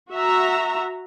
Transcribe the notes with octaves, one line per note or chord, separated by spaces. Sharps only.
F#4 E5 A#5